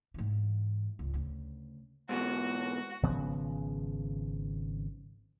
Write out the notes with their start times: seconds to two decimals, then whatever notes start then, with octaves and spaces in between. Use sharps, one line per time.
0.14 G#2 E3
0.99 C#2
1.14 D2 C#3
2.09 G#2 B2 E3 F#4
3.03 G#1 C#3 F3 B3